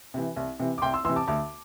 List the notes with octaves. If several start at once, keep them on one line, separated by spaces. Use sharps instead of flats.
C3 E3
C2
C3 E3
D6
C2 G5 C6
C6 E6
C3 E3 C6 E6
A5 D6
D2 A5 D6